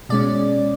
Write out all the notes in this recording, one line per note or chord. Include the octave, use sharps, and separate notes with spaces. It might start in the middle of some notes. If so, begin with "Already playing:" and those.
B2 G#3 C#4 D5